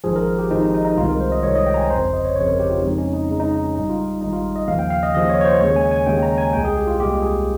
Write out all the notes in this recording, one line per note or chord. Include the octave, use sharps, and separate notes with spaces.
G#1 G#2 F3 G#4
A#4
G4
G#1 G#2 F3 D#4
D#4
D#4
D#4
C2 C3 D#3 G#3 F4
A#4
C5
D#5
C2 C3 D#3 G#3 C#5
D#5
G5
A#5
G#5
G1 F2 C#3 C5
D#5
C#5
G1 F2 C#3 C#5
A#4
G4
F4
F2 C#3 G#3 D#4
C#4
D#4
F2 C#3 G#3 D#4
D#4
D#4
C#4
G#1 G#2 G3 D#4
F4
D#4
G#1 G#2 G3 D#4
F4
D#5
D#2 C#3 F3 F5
G5
F5
D#5
D#2 C#3 F3 D#5
C#5
C#5
C5
D#2 C#3 G#3 C#5
G#5
G#5
D#2 C#3 G#3 G5
A#5
G#5
C2 A#2 G#3 G5
G#4
G4
F4
C2 A#2 G#3 G4
G#4